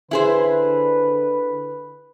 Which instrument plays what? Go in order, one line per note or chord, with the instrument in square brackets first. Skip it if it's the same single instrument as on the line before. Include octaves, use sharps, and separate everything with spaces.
[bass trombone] D3 [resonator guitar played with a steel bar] E4 G#4 C5 [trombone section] B4